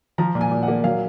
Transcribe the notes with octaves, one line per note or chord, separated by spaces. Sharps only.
F3 A#5
A#2
G#5
A#2
F#5
A#3
F#3 F5